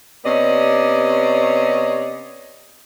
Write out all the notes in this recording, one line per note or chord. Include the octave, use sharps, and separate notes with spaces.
C3 B3 C#4 D5 D#5